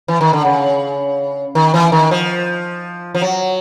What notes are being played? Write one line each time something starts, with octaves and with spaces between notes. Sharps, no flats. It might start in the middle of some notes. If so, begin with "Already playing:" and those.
E3
D#3
D3
C#3
D#3
E3
D#3
F3
F3
F#3